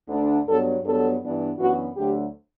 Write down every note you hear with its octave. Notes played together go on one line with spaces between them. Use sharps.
D2 D3 A3 D4
G2 F#3 B3 A4
G2 F#3 B3 A4
G2 E3 B3 D4
F#2 E3 B3 D4 F#4
D2 D3 F#3 A3 G4